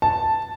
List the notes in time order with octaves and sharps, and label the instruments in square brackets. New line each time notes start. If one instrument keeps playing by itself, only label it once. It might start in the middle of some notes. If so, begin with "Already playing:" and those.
[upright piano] A5